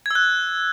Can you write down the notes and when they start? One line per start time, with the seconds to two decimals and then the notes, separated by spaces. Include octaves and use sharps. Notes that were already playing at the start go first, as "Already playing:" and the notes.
0.06 G#6
0.11 E6
0.15 F#6